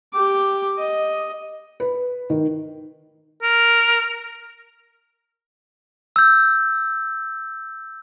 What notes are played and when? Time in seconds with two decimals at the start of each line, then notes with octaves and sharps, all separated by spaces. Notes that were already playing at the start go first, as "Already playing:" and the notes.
0.13 G4 D6
0.78 D#5
1.80 B4
2.30 D#3
3.42 A#4
6.16 E6 G6